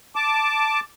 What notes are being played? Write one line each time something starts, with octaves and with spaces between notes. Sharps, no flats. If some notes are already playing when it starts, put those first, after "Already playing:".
A5 D6